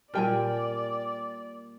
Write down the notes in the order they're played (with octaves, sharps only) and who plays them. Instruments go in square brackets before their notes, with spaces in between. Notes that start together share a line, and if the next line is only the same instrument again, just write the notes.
[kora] A#2 G3 [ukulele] A#4 G5 G#5 [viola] D5